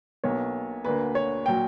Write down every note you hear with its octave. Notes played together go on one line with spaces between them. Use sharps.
B1 B2 A#3 C#5
D2 D3 A#3 B4
C#5
A#2 F#3 G5